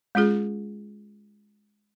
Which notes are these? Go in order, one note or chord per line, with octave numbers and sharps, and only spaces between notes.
G#3 C#4 F4 G#4